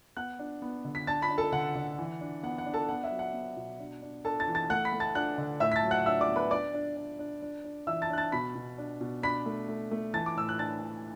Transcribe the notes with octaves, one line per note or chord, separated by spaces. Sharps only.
B3 F#5 F#6
D4
B3
D3
B6
D4 A5 A6
B5 B6
D4
A4 A5
D3 F#5
D3
E3
D4
B3 F#5
F#5
D4
A4 A5
B3 F#5
E5
F#3
F#5
B3
B2
D4
D4
D4 A4 A5
A5 A6
E3
A5 A6
A3 F#5 F#6
B5 B6
A3
A5 A6
D4 F#5 F#6
D3
A2 E5 E6
B6
A5 A6
F#3
F#5 F#6
D4 E5 E6
D5 D6
B3
B4 B5
D4 D5 D6
D4
D4
D4
D4
D4
E3 E5 E6
A5 A6
D4 F#6
A5 A6
B2 B5 B6
B2
D4
B2
D4 B5 B6
A3
A3
A3
E3 A5 A6
D6
A2 E6
F#6
D4 A5 A6
D4